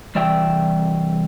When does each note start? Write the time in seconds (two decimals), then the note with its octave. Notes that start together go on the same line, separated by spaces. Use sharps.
0.15 C2 E3 D5 E5 G5